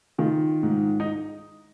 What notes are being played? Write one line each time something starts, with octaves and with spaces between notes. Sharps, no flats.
D#3 F4
G#2
D#4